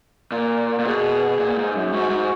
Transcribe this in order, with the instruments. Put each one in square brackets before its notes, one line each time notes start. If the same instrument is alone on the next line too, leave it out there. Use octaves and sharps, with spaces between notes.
[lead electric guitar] A#2 [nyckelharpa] A#4
[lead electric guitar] A#2
[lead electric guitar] B2 [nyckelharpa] G#4
[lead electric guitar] A#2
G#2
F#2
[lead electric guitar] G#2 [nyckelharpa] F#4
[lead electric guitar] G#2